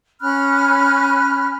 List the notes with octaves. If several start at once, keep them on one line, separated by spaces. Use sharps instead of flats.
C#4 B5 F6 F#6